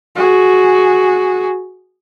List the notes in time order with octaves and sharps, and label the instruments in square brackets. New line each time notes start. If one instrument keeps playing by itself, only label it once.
[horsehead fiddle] F#4 G#4